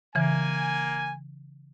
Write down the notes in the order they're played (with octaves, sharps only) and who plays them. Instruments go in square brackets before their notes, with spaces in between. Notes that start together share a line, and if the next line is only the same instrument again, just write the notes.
[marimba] C#3 E3 [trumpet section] A#3 G#5